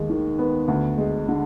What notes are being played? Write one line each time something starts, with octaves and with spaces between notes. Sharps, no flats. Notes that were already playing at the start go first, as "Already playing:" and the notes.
Already playing: D#2 G#3
D#3
B3
D2
G#3
D3